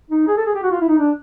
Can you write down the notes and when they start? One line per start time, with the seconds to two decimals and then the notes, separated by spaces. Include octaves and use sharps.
0.10 D#4
0.27 G#4
0.37 A4
0.46 G#4
0.55 G4
0.63 F#4
0.71 F4
0.81 E4
0.89 D#4
0.99 D4